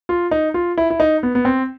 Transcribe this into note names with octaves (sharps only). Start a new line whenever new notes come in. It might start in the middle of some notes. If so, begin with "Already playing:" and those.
F4
D#4
F4
E4
E4
D#4
B3
B3
C4